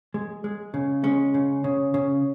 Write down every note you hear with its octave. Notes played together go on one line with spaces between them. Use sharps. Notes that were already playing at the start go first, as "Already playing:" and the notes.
G#3
G#3
C#3
G#3 C#4
C#3
C#3
C#3